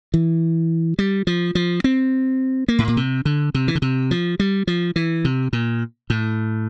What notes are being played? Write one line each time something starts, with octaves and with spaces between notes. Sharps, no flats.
E3
G3
F3
F3
C4
A#3
A2
A#2
C3
D3
C3
E3
D3
C3
F3
G3
F3
E3
C3
A#2
A2